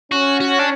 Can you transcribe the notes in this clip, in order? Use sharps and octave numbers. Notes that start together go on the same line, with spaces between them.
C#4 F#4
F#4
D4